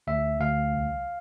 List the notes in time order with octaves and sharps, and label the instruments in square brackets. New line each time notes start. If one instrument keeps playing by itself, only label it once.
[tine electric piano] D2 E5
D2 F5
C2